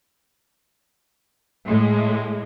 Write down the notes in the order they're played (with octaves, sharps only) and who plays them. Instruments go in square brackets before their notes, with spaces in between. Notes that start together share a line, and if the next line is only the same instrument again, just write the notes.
[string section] A2 G#3